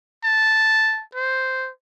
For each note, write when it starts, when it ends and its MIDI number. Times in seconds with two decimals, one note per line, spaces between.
0.24 1.02 81
1.15 1.70 72